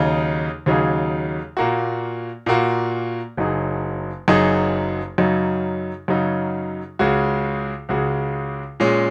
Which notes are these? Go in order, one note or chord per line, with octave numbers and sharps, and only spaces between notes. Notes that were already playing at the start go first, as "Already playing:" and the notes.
Already playing: D#2 C#3 F#3 D#4 G#4
D#2 C#3 F#3 D#4 G#4
A#2 A#3 F#4
A#2 A#3 F#4
F#1 F#2 F#3 D#4 G#4
F#1 F#2 F#3 D#4 G#4
F#2 C#3 F#3 D#4
F#2 C#3 F#3 D#4
C#2 C#3 G#3 F#4
C#2 C#3 G#3 F#4
A#2 G#3 C#4